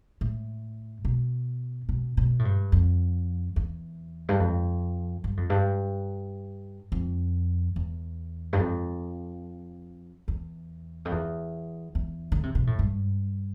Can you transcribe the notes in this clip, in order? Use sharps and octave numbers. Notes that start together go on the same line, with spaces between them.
A2
B2
B2
B2
A2
G2
F2
E2
G2
F2
G2
F2
G2
F2
E2
G2
F2
E2
F2
E2
E2
D3
C3
B2
A2
G2